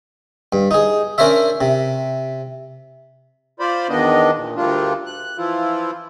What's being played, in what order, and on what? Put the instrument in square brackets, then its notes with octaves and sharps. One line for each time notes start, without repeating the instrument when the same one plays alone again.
[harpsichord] G2
D#4 G#4
C#4 D4 A#4 C5 C#5 E5
C3
[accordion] F4 C5 D5 B5
E2 D#3 B3 D4 D#5
A#2
D2 G3 A3 A#3 D4 F4
F#6
E3 F3 E4 F4